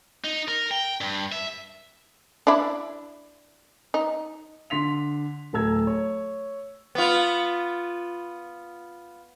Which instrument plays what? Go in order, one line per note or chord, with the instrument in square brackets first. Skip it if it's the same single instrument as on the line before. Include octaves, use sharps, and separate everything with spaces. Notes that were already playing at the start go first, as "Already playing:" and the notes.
[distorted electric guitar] D#4
A#4
G5
G2
E5
[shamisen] D4 E4
D#4
[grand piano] D3 C6 B6 F7
D1 A4 A#5 E6 G#6
C#5
[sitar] B3 F4